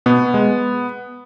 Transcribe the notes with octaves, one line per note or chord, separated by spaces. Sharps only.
B2 B3
G#3